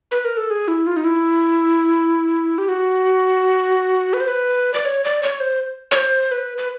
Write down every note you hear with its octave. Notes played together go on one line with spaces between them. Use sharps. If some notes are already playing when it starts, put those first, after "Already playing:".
B4
A#4
A4
G#4
E4
F4
D#4
E4
G4
F#4
B4
C5
B4
D5
C#5
D5
C#5
C5
C#5
C5
B4
B4